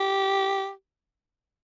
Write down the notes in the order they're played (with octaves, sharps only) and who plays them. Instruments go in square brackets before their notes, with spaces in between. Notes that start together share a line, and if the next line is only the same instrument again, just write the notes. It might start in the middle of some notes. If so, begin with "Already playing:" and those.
Already playing: [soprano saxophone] G4